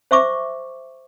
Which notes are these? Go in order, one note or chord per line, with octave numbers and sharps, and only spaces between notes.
C5 E5 C#6 D6